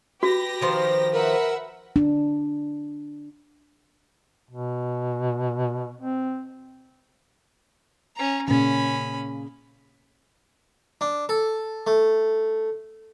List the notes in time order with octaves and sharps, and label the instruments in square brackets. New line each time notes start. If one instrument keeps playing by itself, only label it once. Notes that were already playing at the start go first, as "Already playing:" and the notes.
[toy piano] F#4 [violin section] G4 B4 A#6
[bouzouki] D#3 F3 C5
[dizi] A#4 [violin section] B4 E5 F#5
[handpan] D4
[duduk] B2
C4
[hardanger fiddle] C#4 A#5
[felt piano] A#2 C#3 [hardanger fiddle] C#4 B5
[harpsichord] D4
A4
A3